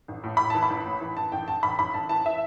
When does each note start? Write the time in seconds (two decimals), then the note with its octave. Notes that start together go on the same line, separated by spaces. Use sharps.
0.08 A1
0.24 A2
0.37 A2 B5
0.50 E3 A5
0.63 B5
0.70 A1
0.86 A2
1.01 E3
1.17 A1 A5
1.32 A1 G5
1.48 A1 A5
1.63 A1 B5
1.79 A1 B5
1.94 A1 A5
2.09 E3 A5
2.26 E5